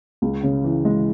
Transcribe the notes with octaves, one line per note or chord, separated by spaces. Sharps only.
C#2
C#3
E3
G#3